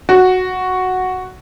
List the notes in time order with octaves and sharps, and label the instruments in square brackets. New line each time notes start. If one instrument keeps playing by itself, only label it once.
[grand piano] F#4